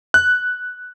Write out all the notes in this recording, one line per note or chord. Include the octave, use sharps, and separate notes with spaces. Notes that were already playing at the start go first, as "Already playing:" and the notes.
F#6